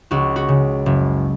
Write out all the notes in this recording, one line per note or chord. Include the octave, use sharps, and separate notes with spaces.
C#2 F#4
F#4
C#3
F#1